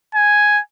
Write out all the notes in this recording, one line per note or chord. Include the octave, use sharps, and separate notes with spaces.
G#5